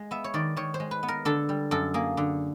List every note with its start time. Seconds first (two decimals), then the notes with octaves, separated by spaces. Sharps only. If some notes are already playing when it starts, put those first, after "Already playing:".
Already playing: G#3
0.11 B3 E5
0.24 C#5
0.34 D#3 D5
0.56 D#3 C#5
0.74 C5
0.80 G#3
0.91 B4
1.03 B3
1.08 A#4
1.25 D3 A4
1.49 G3
1.71 F#2 A4
1.94 A#3 G#4
2.17 D3